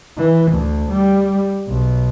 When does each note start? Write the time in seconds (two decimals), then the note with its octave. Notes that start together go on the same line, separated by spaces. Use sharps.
0.17 E3
0.51 D2
0.90 G3
1.67 B1